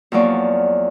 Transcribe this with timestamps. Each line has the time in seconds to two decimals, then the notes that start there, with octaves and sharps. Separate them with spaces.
0.12 E2 F3 F#3 A#3 D5 C#6